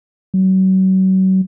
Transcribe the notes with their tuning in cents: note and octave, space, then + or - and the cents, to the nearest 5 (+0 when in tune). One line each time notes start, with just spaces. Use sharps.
F#3 +35